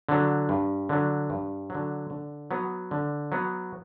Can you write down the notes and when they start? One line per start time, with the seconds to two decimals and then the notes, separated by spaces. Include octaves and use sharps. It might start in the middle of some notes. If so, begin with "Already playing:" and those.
0.09 D3 F#3
0.49 G2
0.89 D3 F#3
1.30 G2
1.70 D3 F#3
2.10 D3
2.51 F#3 B3
2.91 D3
3.32 F#3 B3